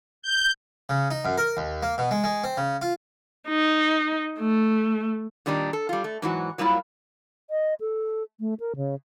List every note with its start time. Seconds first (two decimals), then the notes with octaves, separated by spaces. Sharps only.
0.22 G6
0.89 C#3
1.11 D#4
1.25 F#2
1.38 A#4
1.57 D#2
1.83 A#3
1.98 B2
2.11 G#3
2.24 G#3
2.44 C4
2.57 C#3
2.82 F4
3.49 D#4
4.40 A3
5.46 A#2 D#3 G3 D4 D#4
5.73 A4
5.89 G3 F4
6.04 A3
6.22 G#2 E3 F#3 F#4
6.58 F#3 G3 A#3 E4 F4
7.50 D#5
7.81 A4
8.40 A3
8.60 A#4
8.76 C#3